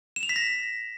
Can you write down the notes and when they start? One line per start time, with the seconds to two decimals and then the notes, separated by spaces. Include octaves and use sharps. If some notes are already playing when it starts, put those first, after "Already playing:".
0.16 E7
0.23 F7
0.29 B6
0.36 A#6